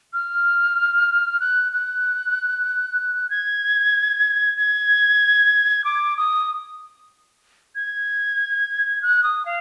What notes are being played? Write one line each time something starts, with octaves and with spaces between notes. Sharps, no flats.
F6
F#6
F#6
G#6
G#6
D6
D#6
G#6
F#6
D#6
F5